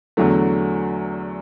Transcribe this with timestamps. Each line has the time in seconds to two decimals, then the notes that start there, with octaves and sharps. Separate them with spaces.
0.17 E2 D3 F#3 A3